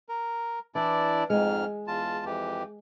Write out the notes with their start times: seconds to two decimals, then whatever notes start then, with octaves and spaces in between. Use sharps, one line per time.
0.09 A#4
0.75 E3 D4 E4 D5
1.30 F2 G#2 G#3 F6
1.88 E2 F4 A5
2.26 F2 E3 G4